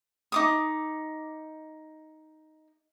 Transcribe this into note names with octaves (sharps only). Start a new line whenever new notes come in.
D#4 D6 D#6